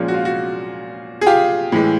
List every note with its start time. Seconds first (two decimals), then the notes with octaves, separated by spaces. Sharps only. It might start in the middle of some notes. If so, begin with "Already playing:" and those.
Already playing: A#2 F3 G#3 C#4
0.08 F#4
0.14 F4
0.25 F#4
1.21 G#4
1.27 F4 G4
1.72 A2 E3 G#3